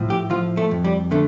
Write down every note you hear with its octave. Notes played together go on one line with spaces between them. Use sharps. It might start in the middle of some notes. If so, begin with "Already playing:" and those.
Already playing: A2 F3
G4
F3 F4
A3
F2
G3
D3 A3